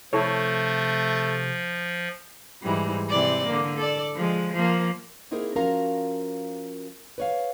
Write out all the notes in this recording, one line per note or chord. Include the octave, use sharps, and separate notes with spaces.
C3 F3 A3 E4 A4 C#5
G#2 E3 G3
C3 E3 D5
D3 A#3
A4 D5
F3 G#3
F3 A#3
A#3 C4 D#4 E4 G#4 A#4
F3 C#4 F#4 A#4 F5 A#5
B4 C#5 F5